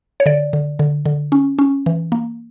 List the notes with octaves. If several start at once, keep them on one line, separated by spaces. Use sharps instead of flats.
C#5
D3 D5
D3
D3
D3
C#4
C#4
E3
A#3